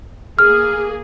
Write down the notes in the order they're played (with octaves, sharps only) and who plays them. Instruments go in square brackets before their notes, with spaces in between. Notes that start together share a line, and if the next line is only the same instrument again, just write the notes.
[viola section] A#3 G#4 [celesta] F6